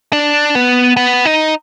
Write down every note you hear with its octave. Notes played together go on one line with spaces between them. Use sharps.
D4
B3
B3
D#4